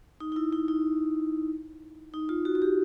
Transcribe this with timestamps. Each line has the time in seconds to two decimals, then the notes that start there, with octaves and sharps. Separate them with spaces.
0.20 D#4
0.32 D#4
0.36 E4
0.53 D#4
0.68 D#4
2.14 D#4
2.29 F4
2.45 F#4
2.55 F#4
2.62 G4